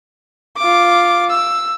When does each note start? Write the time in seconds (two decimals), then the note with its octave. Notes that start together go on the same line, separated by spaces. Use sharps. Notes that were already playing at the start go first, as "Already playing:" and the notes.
0.57 F4 D6
1.30 E6